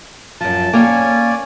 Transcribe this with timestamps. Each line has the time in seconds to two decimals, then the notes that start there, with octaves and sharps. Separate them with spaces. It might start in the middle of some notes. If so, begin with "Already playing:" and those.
0.41 F#2 F3 A5
0.73 A#3 C#4 C#5 D5 G5 G#5